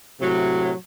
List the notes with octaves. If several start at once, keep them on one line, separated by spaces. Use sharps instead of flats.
A2 C3 F#3